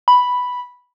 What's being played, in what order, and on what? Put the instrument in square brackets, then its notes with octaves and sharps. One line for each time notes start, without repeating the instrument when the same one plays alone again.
[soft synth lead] B5